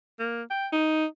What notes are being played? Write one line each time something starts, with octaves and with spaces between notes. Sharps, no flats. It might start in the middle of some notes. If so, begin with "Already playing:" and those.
A#3
G5
D#4